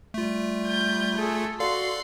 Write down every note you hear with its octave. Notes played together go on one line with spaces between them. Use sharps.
G3 A3 F4
G6
G#4 A4
F#4 A4 D5 F5 C6